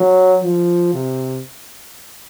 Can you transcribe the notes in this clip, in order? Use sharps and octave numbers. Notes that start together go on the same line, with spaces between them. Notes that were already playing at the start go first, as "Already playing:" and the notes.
Already playing: F#3
F3
C3